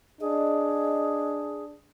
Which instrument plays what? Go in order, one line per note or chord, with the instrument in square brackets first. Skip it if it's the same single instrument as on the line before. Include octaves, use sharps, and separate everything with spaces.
[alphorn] D4 [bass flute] G#4 [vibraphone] D#5